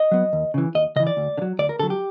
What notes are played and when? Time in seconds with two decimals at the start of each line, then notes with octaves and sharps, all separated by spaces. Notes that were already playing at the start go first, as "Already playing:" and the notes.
Already playing: D#5
0.11 F#3 B3
0.33 D#2
0.54 C#3 E3
0.75 D#2 D#5
0.96 C#3 D#5
1.00 E3
1.07 D5
1.17 D2
1.38 D3
1.42 F#3
1.59 D2 D5
1.69 A#4
1.79 D3 F#3 A4
1.90 G4